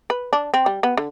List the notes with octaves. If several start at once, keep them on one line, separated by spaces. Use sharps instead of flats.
B4
D4
C4
G3
B3
D3